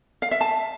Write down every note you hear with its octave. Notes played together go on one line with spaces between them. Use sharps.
F5
E5
A5